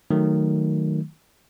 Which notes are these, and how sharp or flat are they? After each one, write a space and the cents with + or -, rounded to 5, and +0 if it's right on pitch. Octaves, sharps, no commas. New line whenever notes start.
D#3 +0 F#3 +0 A3 +0